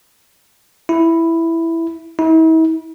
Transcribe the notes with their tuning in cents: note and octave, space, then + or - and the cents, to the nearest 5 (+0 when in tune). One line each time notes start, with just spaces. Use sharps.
E4 +0
E4 -45